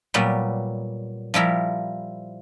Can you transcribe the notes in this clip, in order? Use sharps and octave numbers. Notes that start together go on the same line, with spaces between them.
A#2 F#3 G3 B3
F3 G3 E4 A#4